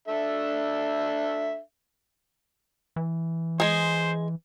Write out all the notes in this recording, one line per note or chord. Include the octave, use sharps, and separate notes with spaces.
D4 A4 E5
E3
G#3 G#4 C5